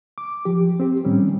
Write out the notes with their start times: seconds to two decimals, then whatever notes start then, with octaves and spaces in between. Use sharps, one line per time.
0.18 D6
0.45 F3 G4
0.80 C4 G4
1.04 A2 D#3 G3 C4 C#4